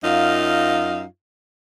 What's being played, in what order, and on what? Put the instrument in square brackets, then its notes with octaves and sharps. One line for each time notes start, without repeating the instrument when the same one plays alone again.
[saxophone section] F#2 D#4 F4 F5